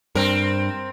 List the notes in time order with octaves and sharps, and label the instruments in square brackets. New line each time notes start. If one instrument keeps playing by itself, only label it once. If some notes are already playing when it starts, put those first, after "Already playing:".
[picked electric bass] G2 [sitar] C4 A#4